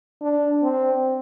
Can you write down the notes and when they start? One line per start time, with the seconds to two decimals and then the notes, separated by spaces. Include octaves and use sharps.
0.21 D4
0.63 C4